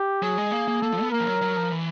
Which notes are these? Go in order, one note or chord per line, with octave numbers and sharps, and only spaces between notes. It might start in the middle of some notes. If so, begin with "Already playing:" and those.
Already playing: G4
F#3 G#4
G#3
A#3
A#3
A#3 A4
F3
B3
A#3 A#4
F3
F#3
F#3
F3
E3